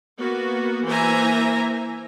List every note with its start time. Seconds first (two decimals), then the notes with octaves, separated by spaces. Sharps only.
0.19 A#3 B3 F#4
0.86 E3 A#3 C5 E5 G#5 A#5